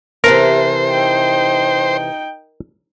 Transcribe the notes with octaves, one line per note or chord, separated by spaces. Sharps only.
C3 E3 A4 A#4 C5
D#4 G5